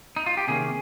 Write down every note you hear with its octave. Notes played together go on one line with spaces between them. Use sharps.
D#4
F4
G4
C3 D#3 A#3 C#4 G#4